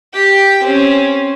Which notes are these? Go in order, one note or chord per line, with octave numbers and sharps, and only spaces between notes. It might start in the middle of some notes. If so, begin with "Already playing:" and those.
G4 G5
C4 C#4